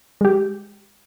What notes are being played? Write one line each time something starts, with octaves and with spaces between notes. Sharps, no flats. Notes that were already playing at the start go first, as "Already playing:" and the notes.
G#3 G4